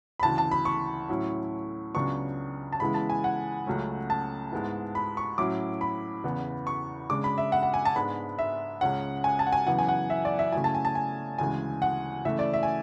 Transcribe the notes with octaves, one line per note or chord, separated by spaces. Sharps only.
B5
D2 C#3 E3 A5
A5
B5
C#6
A2 F#3 C#4 E4
C#2 C#3 F#3 B3 D4 C#6
A5
C#3 E3 G#3 B3 E4 B5
A5
G#5
F#5
C#2 C#3 F#3 A3 C#4
A5
G#2 G#3 B3 E4
B5
C#6
A2 F#3 C#4 E4 D6
B5
E2 C#3 E3 B3
C#6
C#3 G#3 D4 D6
B5
E5
F#5
F#5
G#5
A5
G#2 G#3 B3 D4 B5
E5
C#2 C#3 G#3 C#4 F#5
G#5
A5
F#5
G#5
F#2 C#3 E3 B3 F#5
G#5
F#5
E5
D5
E5
C#3 F#3 A3 E4 G#5
A5
G#5
A5
G#5
D2 C#3 E3 G#3 G#5
F#5
C#3 E3 A3 E5
D5
E5
G#5